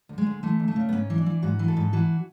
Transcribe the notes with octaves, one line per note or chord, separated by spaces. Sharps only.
D2
G#3
D2
E3 A3
D2
A3
C#3
B3
G#2 C#4
E3
D4
E3
G#2 F#4
E3
A4
G#2
E3 F#4